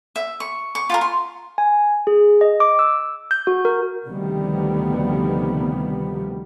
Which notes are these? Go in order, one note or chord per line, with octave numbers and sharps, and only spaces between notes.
E5
C#6
C#6
F4 G4 A#4
C6
G#5
G#4
D#5
D6
E6
G6
F#4
A#4
D2 C3 D#3 F3 G3 B3